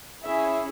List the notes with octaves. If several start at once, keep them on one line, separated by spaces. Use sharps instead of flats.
C#4 E4 G#4 E5